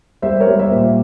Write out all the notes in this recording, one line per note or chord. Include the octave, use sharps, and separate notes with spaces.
G3 C5 E5
A#4 C#5
G3
C5 E5
A#2